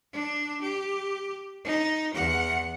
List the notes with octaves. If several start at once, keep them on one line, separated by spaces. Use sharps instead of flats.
D4
G4
D#4
E2 F#5